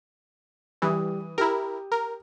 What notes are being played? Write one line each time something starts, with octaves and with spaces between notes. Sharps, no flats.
E3 G3 D#6
E4 G4 A#4
A#4